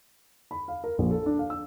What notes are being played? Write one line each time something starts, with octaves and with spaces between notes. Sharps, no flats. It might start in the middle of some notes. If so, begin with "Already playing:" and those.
B5
F5
A#4
A#1
A4
D4
F5
E6